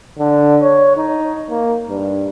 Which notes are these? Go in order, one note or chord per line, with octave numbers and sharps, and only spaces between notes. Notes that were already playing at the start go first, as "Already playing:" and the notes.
D3
C#5
D#4
A#3
G2